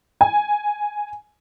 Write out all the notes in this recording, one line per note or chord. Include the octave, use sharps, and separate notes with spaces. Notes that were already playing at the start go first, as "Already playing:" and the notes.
G#5